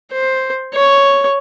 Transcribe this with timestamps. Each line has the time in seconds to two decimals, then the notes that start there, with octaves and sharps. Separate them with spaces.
0.13 C5
0.74 C#5